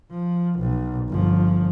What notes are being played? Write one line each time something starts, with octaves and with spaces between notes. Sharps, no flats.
F3
B1
G1 F3